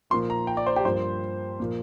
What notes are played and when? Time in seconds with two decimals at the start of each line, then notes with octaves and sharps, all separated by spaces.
0.10 A#2 F3 A#3 C6
0.30 A#5
0.47 G5
0.57 D5
0.67 C5
0.76 G4
0.85 G2 F3 A#3 C5
1.60 A#2 F3 A#3